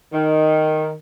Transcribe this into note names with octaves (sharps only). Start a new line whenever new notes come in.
D#3